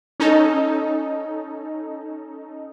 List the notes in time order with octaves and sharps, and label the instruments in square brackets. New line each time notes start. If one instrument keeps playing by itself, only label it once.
[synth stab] C#4 D#4 A4